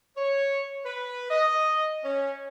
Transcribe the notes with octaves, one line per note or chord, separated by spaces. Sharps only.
C#5
B4
D#5
C#4